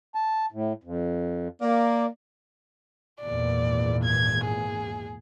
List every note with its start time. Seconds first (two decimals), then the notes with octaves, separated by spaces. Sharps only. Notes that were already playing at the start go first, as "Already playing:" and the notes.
0.15 A5
0.52 A2
0.84 F2
1.62 A#3 D5
3.22 G#1 E2 A#2 D5
4.04 G#6
4.45 G#4